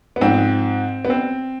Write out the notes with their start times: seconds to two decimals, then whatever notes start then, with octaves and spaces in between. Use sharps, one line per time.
0.16 B3
0.21 G#2 F3 C4
1.05 B3
1.10 C4